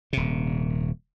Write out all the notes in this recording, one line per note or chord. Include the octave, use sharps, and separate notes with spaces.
D#1 C3